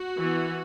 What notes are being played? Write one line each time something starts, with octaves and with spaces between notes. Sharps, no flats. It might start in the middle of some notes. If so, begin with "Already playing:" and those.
Already playing: F#4
E3 B3